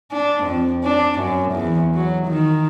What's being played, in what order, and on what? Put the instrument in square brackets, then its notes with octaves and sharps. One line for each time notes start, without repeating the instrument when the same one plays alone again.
[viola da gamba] D4
F2
D4
F#2
E2
F#3
D#3